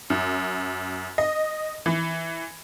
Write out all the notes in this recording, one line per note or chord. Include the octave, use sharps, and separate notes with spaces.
F#2
D#5
E3